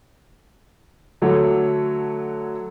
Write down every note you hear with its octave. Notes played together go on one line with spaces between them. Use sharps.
D3 F#3 A3 C#5